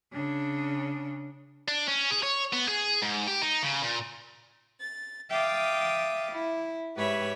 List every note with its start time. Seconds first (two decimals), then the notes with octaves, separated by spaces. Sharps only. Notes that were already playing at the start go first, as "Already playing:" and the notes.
0.12 C#3 D4
1.68 D4
1.88 C#4
2.11 G#4
2.23 C#5
2.53 B3
2.68 G#4
3.02 G#2
3.28 G4
3.42 D#4
3.63 C#3
3.82 A#2
4.80 A6
5.29 E5 F5 G5 D6 D#6 A6
6.31 E4
6.96 G#2 G4 B4 C#5 E5 B5